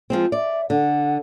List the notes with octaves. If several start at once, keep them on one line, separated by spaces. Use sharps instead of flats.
F3 G#3 C4
D5 E5
D3 F#5